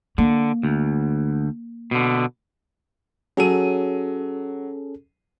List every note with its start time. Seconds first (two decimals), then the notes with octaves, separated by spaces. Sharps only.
0.18 D3 A#3
0.63 D2
1.91 B2 D3
3.37 F#3 C#4 G#4 A4 D#7